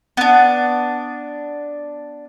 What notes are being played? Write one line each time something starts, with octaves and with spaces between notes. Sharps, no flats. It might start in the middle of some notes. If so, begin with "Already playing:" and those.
B3 D4